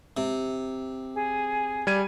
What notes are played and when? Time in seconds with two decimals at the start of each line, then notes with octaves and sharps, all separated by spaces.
0.17 C3
1.15 G#4
1.87 G3 G#6 D#7